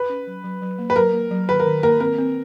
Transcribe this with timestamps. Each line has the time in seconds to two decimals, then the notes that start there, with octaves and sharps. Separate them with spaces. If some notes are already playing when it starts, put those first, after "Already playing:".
Already playing: B4
0.09 C#4
0.27 F#3
0.44 F#3
0.62 F#3
0.78 A#3
0.90 B4
0.96 F#3 A#4
1.13 A#3
1.31 F#3
1.48 D#3 B4
1.60 A#4
1.66 D#3
1.83 A#3 A#4
2.00 C4 A#4
2.18 C4